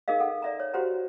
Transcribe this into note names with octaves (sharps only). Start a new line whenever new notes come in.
D#4 G#4 A#4 D#5 F5
A4 F#5
D5 E5 A#5
C#5
F#4 G4 C5 F#5 A#5